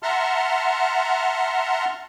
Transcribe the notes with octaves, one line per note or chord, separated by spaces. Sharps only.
E5 F#5 A5 A#5 C6 F6